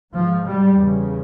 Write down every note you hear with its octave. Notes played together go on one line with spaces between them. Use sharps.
G#2 F3
G3
E2 C#3